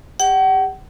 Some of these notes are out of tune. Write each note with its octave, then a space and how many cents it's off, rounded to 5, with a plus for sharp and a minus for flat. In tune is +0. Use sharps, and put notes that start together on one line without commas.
G4 +40 F#5 +40